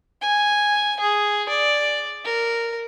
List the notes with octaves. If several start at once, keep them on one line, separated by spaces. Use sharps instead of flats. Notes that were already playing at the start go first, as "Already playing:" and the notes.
G#5
G#4
D5
A#4